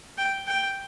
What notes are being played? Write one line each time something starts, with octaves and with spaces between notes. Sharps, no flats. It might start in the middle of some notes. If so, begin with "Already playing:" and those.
G5
G5